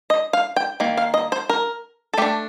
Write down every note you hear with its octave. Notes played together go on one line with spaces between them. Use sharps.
D#5
F5
G5
D#3 A#3
F5
D#5
C5
A#4
A4
A3 D4 G4